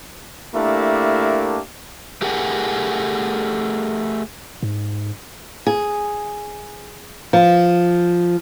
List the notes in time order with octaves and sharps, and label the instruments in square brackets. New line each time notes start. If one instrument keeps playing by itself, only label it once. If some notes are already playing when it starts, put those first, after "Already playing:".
[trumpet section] A3 A#3 D4 E4 G4 A#4
[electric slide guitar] A3 G4 G#4 A#4 F#5
[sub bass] G#2
[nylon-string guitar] G#4
F3